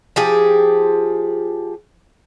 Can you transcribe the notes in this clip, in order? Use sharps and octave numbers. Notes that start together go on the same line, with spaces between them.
F3 G4 G#4